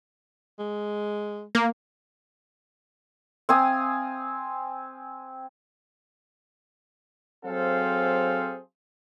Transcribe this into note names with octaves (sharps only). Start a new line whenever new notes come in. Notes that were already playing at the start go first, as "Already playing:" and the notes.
G#3
A#3
C4 F5 G#5 D#6
F#3 C4 G#4 A4 C5 F5